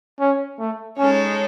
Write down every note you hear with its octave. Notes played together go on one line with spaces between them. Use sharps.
C#4
A3
G#3 C#4 D#4 A4 C#5